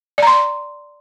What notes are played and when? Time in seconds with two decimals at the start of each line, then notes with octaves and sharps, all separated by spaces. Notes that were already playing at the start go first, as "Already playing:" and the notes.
0.18 D5
0.22 A#5
0.27 C6